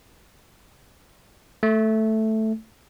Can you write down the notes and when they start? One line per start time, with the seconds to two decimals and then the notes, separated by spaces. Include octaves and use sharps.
1.63 A3